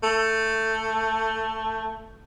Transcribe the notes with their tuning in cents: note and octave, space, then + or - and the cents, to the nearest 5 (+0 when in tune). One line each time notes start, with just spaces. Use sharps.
A3 +15